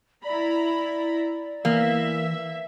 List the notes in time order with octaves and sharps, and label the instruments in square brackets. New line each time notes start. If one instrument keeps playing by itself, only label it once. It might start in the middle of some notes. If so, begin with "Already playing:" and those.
[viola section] E4 A#5 B5 [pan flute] D5
[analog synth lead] E3 [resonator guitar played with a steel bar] A#3 [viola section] E5